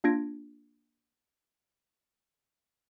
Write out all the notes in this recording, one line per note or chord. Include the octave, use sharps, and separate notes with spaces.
A#3 D4 F4 G#6 A#6 D7